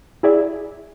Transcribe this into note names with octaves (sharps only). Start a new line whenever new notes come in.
E4 G#4 D5 E5